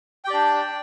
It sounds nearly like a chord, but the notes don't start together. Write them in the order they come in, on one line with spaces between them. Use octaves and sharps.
G5 G4 D5 D4